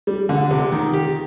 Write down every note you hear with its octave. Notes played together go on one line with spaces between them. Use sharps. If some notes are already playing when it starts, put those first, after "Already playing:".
G3
D3
C3
D#3
G4